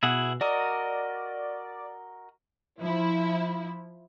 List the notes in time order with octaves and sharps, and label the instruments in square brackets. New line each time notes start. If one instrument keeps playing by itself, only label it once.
[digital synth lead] B2 [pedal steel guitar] E4 G#4 F#5
[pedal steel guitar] F#4 A#4 D#5 [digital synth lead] D5
[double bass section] F3 [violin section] E4